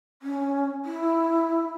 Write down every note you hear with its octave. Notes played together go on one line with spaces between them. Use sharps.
C#4
E4